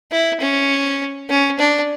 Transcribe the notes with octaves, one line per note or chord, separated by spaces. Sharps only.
E4
C#4
C#4
D4